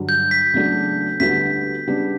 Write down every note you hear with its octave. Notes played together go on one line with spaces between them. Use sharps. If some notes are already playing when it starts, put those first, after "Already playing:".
Already playing: G2 D3 F#3
G6
B6
E2 C#3 F#3 A3 D4
D2 D3 G3 B3 F#4 B6
C#3 G3 B3 D4 G4